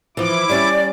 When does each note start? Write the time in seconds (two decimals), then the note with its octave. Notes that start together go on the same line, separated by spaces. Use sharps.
0.17 E3 F3 E4 D6
0.49 G3 C#4 D5